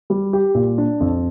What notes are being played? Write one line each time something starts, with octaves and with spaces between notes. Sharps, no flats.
G3
G4
A#2
D4
F2